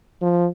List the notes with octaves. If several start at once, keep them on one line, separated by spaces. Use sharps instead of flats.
F3